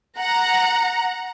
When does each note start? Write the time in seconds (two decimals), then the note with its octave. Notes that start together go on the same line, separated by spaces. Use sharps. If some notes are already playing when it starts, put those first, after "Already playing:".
0.18 F#5 A#5